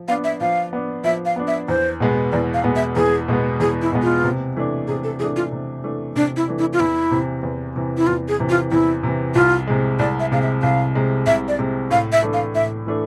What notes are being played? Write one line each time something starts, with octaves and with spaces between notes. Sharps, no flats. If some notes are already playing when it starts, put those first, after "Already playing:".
Already playing: F3
B3 D4 F5
E5
F3 F5
B3 D4
F3 E5
F5
B3 D4
E5
E2 C5
B2 G#3 B3
E2 D5
F5
B2 G#3 B3
E5
E2 G#4
B2 G#3 B3
E2 G#4
E4
B2 G#3 B3
F4
C3
E3 A3 D4
C3 G#4
A4
E3 A3 D4 G#4
F4
C3
E3 A3 D4
C3 D4
E4
E3 A3 D4
E4
F4
E2 E4
C3 E3
E2
C3 E3
E4
E2 F4
G#4
C3 E3
F4
E2 E4
C3 E3
C2 F4
C3 G#3
C2 D5
E5
C3 G#3 F5
E5
C2 F5
C3 G#3
C2 E5
D5
C3 G#3
A2 F5
E5
E3 A3 D4 A4
F5
A2 E5
E3 A3 D4 A4